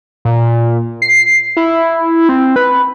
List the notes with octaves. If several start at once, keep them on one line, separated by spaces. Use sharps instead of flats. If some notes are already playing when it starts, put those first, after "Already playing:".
A#2
C7
E4
C4
B4